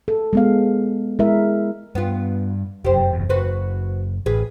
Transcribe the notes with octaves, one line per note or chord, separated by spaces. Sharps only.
A4
G#3 B3 F5
G#3 E4 A#4 E5
G2 B3 F4
F1 F#2 G4 C5
F#1 E2
F#1 F#4 B4 C5
A1 G#4 B4